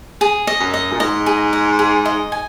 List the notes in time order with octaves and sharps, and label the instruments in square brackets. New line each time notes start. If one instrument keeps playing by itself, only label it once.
[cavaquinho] G#4
D#5
[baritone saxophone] F#2
[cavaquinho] D#5
[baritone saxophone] A#2
[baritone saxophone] G#2 [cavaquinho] D#5
[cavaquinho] G#4
D#5
G#4
D#5
G#5